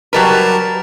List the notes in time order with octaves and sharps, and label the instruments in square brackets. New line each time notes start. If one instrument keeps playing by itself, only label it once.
[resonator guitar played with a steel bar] F#3 G3 B4 [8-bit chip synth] A#4 A5